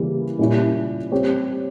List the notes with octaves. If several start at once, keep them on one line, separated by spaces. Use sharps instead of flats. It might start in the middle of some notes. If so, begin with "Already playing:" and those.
Already playing: C#3 E3 G3 A#3
A#2 G3 C#4 E4
G3 C4 G4 C#5